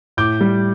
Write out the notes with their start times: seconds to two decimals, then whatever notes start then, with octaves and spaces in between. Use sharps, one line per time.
0.17 A2 D6 G6
0.41 G3